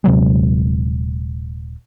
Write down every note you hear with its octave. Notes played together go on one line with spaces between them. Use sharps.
D#1 C3 F#3 G#3